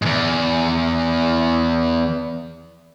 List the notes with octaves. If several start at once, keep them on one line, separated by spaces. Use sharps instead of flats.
E2 G#2